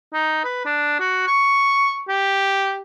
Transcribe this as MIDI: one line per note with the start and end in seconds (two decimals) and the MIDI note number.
0.14 0.43 63
0.45 0.63 71
0.65 0.95 62
1.00 1.26 66
1.28 2.02 85
2.09 2.81 67